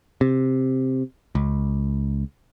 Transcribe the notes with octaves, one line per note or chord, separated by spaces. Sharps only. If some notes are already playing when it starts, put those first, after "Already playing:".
C3
C#2